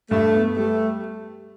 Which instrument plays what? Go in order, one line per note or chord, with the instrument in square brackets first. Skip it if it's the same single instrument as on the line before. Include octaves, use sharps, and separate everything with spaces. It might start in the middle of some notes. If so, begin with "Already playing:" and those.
[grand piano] G2 [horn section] A3
[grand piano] B3
[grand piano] G3 [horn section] A3